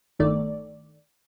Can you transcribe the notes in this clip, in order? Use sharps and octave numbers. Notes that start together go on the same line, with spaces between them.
G1 D#3 A3 D5